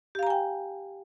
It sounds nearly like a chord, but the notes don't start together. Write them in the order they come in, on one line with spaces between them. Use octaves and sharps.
G4 F5 A#5 G#5 G5